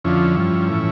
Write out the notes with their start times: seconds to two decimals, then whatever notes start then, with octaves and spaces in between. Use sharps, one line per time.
0.05 F2 D3 F3 C#4 E4
0.37 G2 F3
0.69 A2 E3